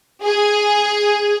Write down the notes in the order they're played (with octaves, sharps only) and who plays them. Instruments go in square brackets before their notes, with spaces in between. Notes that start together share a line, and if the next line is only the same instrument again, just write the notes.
[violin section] G#4